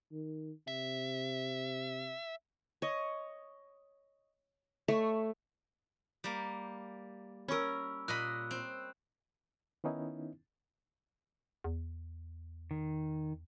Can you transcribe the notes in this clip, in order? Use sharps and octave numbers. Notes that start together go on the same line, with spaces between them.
D#3
C3 E5
C#5 D#5
A3 C#5 E5
G3 A#3
C#4 A#4 B5 C#6 E6
A#2 D#5 B5 F#6
C4
D#3 B3 C#4 D#4 E4
E2
D#3